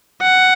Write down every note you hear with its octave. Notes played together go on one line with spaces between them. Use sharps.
F#5